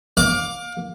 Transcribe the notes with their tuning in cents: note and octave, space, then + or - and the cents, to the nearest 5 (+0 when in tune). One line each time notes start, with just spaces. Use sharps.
F5 +30 D6 +0